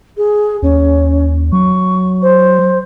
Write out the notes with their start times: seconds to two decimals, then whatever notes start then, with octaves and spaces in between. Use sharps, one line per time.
0.17 G#4
0.62 D#2 C#4
1.52 F#3 C#6
2.22 C5